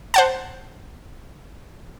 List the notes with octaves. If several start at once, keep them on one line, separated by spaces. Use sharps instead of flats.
C5 F#5 A5